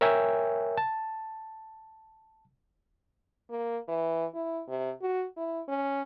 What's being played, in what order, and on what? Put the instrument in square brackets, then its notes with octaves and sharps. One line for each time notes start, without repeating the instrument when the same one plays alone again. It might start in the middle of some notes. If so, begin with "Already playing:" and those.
[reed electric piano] A#4 C#5 E5 G5 G#5
A5
[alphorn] A#3
E3
E4
C3
F#4
E4
C#4